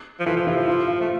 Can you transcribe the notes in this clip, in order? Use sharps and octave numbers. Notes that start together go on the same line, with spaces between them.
F3
E3 F4 A4
F3
E3 E4 G4
F3
F4
F4
A3